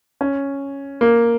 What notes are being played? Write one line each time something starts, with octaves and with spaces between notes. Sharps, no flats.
C#4
A#3